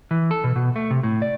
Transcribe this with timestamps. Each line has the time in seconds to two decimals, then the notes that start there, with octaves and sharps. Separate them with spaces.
0.11 E3
0.31 A4
0.44 B2
0.56 B2
0.76 A3
0.91 C3
1.03 A2
1.22 D5